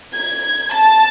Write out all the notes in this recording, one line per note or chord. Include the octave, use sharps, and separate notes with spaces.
G#6
A5